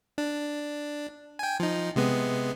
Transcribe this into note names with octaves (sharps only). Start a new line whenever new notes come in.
D4
G5 G#5
F3 D#4
C3 G#3 B3